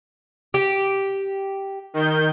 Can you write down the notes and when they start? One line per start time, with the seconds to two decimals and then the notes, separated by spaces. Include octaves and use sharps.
0.54 G4
1.94 D#3 G6